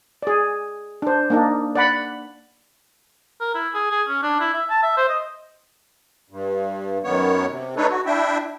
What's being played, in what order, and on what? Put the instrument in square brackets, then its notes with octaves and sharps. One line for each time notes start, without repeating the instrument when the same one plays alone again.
[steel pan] G#4 D5
D4 C5
A#3 D4 D#4
D5 F#5 B5
[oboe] A#4
E4
G#4
G#4
C#4
D4
E4
E5
A5
E5
C5
D#5
[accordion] G2
F#2 D#3 B3 C#5
C3
A3 D4 D#4 A4 B4 C#5
F#4
D4 E4 E5 G5